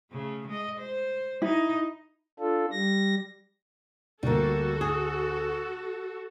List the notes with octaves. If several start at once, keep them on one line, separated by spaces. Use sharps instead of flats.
C#3 A3
G#3 D#5
C5
D#4 E4 D#5
D4 F4 A4
G3 A#6
D2 G3 A#3 F#4 A4
G#4